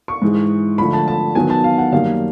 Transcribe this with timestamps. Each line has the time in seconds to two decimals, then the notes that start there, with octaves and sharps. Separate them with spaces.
0.08 C#6
0.22 G#2 E3 G#3
0.78 D3 F3 A3 B5
0.93 A5
1.08 A5
1.35 D#3 F#3 B3 G#5
1.50 A5
1.64 F5
1.78 F#5
1.92 F#2 D#3 G3 A#3 F5